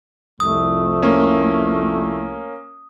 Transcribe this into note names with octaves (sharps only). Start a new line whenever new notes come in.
C2 F2 A3 D#6
A#3 C#4